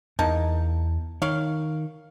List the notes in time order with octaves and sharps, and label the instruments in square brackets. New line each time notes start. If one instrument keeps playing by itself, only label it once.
[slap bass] E2 [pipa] A#3 D#4 A5
[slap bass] D#3 [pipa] C#5 F5